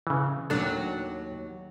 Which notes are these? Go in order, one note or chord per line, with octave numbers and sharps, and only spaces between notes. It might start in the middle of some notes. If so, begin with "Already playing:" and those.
C#3 E3
D#2 F#3 D4 A4